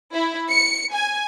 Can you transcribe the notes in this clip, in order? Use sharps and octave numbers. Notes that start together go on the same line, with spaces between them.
E4
C#7
G#5